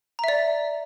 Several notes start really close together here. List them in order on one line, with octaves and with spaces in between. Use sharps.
A#5 E5 D5